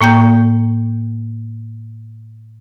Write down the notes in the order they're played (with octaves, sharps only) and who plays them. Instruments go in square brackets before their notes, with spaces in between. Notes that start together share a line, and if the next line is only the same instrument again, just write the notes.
[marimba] A2 A#3 G5 G6